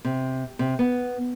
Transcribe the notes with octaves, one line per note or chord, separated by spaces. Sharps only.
C3
C3
B3